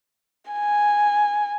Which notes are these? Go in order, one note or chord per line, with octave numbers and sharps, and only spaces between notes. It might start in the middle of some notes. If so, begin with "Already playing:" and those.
G#5